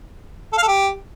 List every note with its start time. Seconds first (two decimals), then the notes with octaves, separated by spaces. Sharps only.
0.53 A4
0.58 F5
0.63 A4
0.68 G4